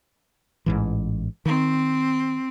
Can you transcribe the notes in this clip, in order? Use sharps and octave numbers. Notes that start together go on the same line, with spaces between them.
A1 G#2 E3
D#3 C4